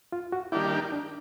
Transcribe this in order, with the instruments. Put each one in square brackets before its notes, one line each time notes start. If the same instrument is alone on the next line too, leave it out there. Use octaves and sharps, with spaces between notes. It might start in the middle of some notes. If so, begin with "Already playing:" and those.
[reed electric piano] F4
F#4
[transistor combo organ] D#3 G3 A#3 D4 G4 [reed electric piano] E4
[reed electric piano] D#4
D4